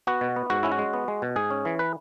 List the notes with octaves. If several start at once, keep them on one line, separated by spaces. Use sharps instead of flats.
B3 F#4
B2
B3
G#2 F#4
C#4 E4
F#4
G#3
B3
G#3
B2
G#2 G#4
C#4
E3
B4